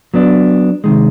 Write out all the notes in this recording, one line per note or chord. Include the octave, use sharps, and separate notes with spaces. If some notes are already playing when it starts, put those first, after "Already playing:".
F#3 B3 D4
C3 D#3 G#3